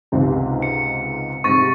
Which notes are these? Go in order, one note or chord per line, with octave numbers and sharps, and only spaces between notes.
C#2 G#2 C3
C#7
G#2 C3 C#6 A6